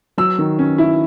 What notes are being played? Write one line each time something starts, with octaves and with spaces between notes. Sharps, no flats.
F#3 E6
D#3
C#4
E4